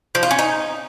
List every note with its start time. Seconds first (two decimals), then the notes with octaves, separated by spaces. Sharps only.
0.15 F3
0.23 F4
0.31 C#4
0.39 D#4